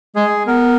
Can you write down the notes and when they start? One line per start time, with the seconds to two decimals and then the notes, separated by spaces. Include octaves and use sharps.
0.16 G#3 G#4
0.47 B3 A#4